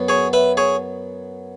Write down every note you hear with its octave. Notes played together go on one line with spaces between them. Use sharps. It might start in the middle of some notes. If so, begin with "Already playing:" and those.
Already playing: F#2 F#3 B3
G#4 C#5
B4 E5
G#4 C#5